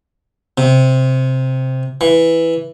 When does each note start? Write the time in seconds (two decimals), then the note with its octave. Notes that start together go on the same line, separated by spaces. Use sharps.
0.58 C3
2.01 E3